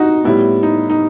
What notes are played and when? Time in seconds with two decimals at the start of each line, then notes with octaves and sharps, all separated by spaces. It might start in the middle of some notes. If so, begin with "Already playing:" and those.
Already playing: D#4 F#4
0.24 A2 G3 B3 E4
0.63 D#4
0.90 D#4